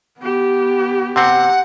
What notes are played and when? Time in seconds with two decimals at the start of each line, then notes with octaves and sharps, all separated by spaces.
0.19 B3 G4
1.16 C3 C4 F#5